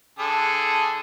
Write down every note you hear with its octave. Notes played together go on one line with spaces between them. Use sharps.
D3 G#4 A4